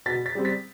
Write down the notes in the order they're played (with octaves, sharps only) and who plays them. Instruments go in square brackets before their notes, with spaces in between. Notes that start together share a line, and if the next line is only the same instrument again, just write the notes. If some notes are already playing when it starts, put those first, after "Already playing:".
[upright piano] B2 A6 B6
A6 B6
G3 C4
A6 B6